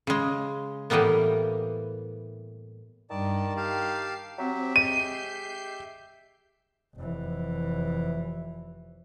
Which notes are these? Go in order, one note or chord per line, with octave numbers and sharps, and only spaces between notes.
C#3 G#3
A2 E3 G3 A#3 B3
G2 D#3 D5 A5
G4 F5 A5 C7
F#3 C4 G4 E5
G#3 G6 C7 D#7
F1 E3